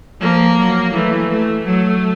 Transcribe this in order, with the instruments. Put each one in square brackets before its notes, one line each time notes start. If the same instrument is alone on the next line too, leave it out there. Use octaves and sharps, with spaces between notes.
[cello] F3 [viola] A#3
[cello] F#3
[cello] E3 [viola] A3
[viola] A3
[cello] F#3 [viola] A3